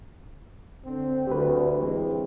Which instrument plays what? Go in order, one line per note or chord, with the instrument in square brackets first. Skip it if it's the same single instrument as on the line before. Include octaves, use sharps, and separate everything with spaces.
[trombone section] D3 C4
[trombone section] D2 [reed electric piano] G4 B4
[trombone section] E3 G#3 C4